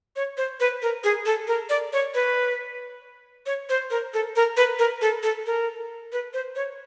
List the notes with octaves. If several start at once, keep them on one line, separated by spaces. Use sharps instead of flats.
C#5
C5
B4
A#4
G#4
A4
A#4
D5
C#5
B4
C#5
C5
A#4
A4
A#4
B4
A#4
A4
A4
A#4
B4
C5
C#5